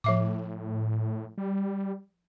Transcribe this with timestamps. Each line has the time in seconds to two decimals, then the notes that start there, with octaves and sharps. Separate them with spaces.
0.04 A2 F3 E5 D6
1.38 G3